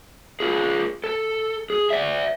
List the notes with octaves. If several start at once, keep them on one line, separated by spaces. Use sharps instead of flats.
F4 G#4
A4
G#4
D5 E5